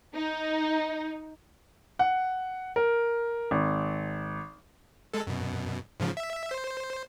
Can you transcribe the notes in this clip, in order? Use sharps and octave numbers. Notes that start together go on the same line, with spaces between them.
D#4
F#5
A#4
G#1
G#3 A4
F#2 B2
G#2 C#3 F3
E5
C5